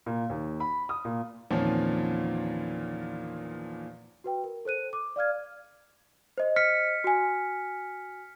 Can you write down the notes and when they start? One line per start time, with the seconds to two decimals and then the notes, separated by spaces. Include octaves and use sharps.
0.06 A#2
0.30 D#2
0.60 B5
0.89 D#6
1.05 A#2
1.51 E2 A#2 D#3 F3 C4 C#4
4.24 F#4 B4 G5
4.44 A#4
4.65 A4 C5 F#6 D#7
4.93 D6
5.16 D5 F5 F6 G#6
6.38 C5 D#5
6.56 F6 B6 C#7
7.04 F#4 G#5